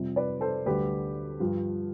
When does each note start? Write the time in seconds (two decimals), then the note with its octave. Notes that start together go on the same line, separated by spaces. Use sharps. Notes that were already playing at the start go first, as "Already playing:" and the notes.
Already playing: F2 C3 G3
0.16 B4 D5
0.41 A4 C5
0.65 D2 D3 G3 G4 B4
1.40 G2 F3